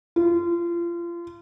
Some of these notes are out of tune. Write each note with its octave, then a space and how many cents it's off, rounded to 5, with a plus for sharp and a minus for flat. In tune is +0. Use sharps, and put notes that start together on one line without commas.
F4 -30